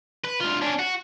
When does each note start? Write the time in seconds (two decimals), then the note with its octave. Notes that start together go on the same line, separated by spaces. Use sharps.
0.25 B4
0.41 D2 F4
0.62 C#4 D4
0.79 F#4